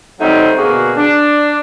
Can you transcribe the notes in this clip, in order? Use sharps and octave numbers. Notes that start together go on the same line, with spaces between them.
D#3 F#3 G3 A3 C4 D#4
B2 D3 A#3 F#4 G#4
D4